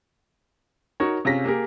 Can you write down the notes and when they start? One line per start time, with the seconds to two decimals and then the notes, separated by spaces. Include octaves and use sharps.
1.00 D#4 F#4 A#4 C#5
1.25 C3 C#4 F4 G#4 A#6 B6
1.45 A#3 G4 G#4 A#4